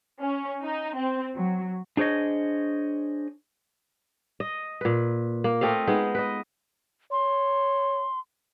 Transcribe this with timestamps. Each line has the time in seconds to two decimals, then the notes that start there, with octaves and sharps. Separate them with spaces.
0.21 C#4
0.62 D#4
0.96 C4
1.36 F#3
1.97 D4 G#4 C5 C#5 D#5
4.40 D#5
4.81 A#2 B4
5.44 A#3
5.61 A3 C4 D#5 F5
5.87 G#3 B3 D#4
6.15 B4 D#5
7.12 C#5 C6